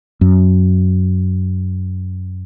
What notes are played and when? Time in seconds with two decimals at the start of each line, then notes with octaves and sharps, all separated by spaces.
0.21 F#2